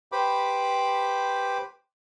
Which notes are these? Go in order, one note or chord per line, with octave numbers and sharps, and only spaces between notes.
G4 B4 C5 B5 D6